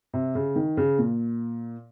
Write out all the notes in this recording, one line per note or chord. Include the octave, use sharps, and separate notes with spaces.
C3
C#3
D#3
C#3
A#2